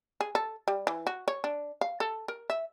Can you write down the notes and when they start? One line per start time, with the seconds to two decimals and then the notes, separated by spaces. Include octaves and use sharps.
0.21 G#4
0.35 A4
0.68 G3
0.87 E3
1.07 F#4
1.28 C#5
1.44 D4
1.81 F5
2.00 A4
2.28 A#4
2.50 E5